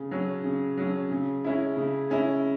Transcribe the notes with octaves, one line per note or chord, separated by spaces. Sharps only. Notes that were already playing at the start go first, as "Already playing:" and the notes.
Already playing: C#3
F#3 C#4
C#3
F#3 C#4
C#3
G#3 C#4 E4
C#3
G#3 C#4 E4